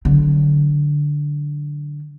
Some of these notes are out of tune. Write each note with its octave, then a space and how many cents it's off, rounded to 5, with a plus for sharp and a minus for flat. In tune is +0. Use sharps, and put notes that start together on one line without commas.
D3 +0 F#3 +0